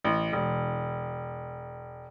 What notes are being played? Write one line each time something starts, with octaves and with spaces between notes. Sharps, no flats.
A1
E1